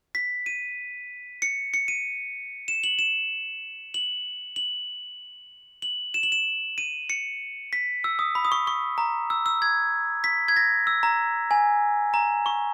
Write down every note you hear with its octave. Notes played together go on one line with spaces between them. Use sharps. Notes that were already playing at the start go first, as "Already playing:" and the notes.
B6
D#7
C#7
C#7
D#7
E7
F#7
E7
F#7
F#7
F#7
E7
F#7
E7
D#7
C#7
B6
E6
D#6
B5
D#6
C#6
C#6
A#5
E6
E6
G#6
B6
G#6
A#6
E6
A#5
G#5
A#5
C#6